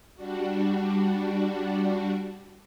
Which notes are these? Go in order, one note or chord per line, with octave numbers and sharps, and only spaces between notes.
G3 D4 F#4